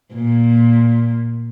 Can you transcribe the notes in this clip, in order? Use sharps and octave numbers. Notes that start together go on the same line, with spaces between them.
A#2